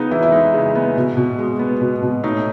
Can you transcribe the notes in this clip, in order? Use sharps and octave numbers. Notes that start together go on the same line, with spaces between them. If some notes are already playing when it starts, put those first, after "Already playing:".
Already playing: C#3 B3 D#4
E3 E4
E4
G#3 D#4
C#3
B3
B2
B2
G#3
B3
B2
B2
A2 D#4